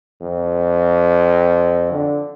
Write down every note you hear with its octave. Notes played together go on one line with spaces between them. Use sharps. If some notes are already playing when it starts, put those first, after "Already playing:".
F2
D3